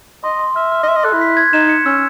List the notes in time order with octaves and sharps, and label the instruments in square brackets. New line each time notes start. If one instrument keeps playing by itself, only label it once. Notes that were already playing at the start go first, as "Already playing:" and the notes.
[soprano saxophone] D#5 [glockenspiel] C6
[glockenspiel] C6
[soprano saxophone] E5 [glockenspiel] F6
[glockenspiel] F6
[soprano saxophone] D#5
[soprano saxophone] E5 [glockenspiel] C6
[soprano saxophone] D#5
[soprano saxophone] A4 [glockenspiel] F#6
[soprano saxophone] E4
[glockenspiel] B6
G#6
[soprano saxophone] D#4 [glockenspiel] E7
[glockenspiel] C#7
[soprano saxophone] C#4 [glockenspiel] E6